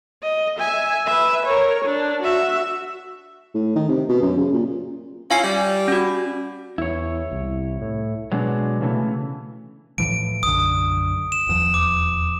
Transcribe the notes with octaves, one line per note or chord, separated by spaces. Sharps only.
D#5
E5 G#5
B4 E5
A#4 C#5
D4
F#4 E5
A2
D#3
C3
B2
F#2
C#3
A#2
C#4 E4 F4 F5 G#5 C7
G3
C#4 F#4
E2 E4 C#5
C2
A2
B2 F#3 G#3 D4
C#3 E3 A3
A2 E3 F3 D7
B1 F#2 D3 D#6
E7
D#1 E2 F3
D6